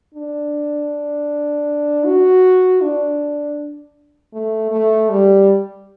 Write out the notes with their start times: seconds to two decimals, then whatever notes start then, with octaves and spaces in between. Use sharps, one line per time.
0.14 D4
2.05 F#4
2.81 D4
4.33 A3
4.71 A3
5.10 G3